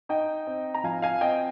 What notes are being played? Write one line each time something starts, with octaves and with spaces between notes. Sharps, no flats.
D#4 D#5 G5
C4
A#5
F3 F5 G#5
F5 G#5
C4 D#5 G5